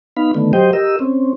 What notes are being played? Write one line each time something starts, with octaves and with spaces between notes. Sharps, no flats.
B3 D#4 F5 B5
D3 D#3 A3 B3
F#3 G4 C5 D#5 G5
G4 A#4 D#5 E6
C4 C#4